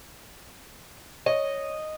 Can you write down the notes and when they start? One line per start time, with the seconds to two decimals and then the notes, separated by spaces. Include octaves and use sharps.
1.26 C#5 D#5